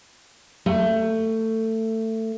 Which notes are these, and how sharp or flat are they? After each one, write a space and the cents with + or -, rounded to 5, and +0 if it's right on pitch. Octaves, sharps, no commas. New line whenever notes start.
A3 +20